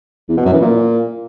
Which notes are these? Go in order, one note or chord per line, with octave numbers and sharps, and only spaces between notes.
E2
B2
F#2
E3
A#2